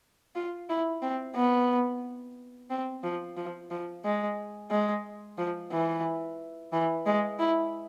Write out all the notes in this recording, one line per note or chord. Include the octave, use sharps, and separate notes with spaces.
F4
E4
C4
B3
C4
F3
F3
F3
G#3
G#3
F3
E3
E3
G#3
E4